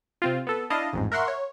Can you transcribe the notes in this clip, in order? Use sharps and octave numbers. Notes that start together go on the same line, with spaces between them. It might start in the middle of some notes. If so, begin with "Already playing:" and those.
C3 C4 F4
B3 A4
D4 E4 D#5 F5 A5
A1 F2 G#2
A#4 E5 F#5 C6 C#6
C#5